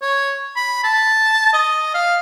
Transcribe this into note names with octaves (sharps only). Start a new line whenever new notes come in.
C#5
B5
A5
D#5
F5